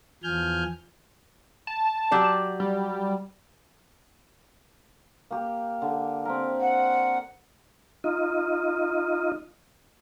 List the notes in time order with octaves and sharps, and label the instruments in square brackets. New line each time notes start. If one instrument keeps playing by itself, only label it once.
[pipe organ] E2 F3 G#5 F6 G6
[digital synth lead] A5
A5
[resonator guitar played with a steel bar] F#3 G4 D5
[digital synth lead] G3
[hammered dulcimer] A#3 G4
D3
C4 G4 A#4
[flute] F#5
[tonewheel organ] D#4 F4 D#5